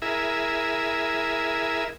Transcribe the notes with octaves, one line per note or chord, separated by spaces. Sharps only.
E4 G#4 A#4 E5